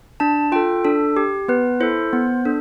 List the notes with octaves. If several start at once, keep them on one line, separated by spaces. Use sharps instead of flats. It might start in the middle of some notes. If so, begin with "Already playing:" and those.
D4 A5
F4 A4 G5
D4 A4
G4
B3 B4
E4 A4 C5
B3
D4 A4